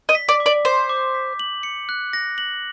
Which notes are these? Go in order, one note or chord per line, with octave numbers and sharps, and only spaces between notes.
D#5
B6
D5
D6
D5
C5 G6
D6
B6
F#7
C#7
F#6
A#6
F#7